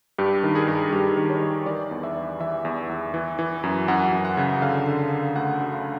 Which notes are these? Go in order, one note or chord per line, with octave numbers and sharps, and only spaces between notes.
G2 G4
D#3
G#4
G2
G2 G4
D#3
C#5
G2
E3 D5
E2
E5
E3
E3 E5
E2
E2
E3
E3
F#2
F#2 F#5
F#2
F#5
C#3
F#5
D3 F5
D3
D3
D2 F#5
D3
F5